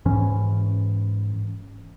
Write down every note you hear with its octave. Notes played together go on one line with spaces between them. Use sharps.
G#2 E3 C#4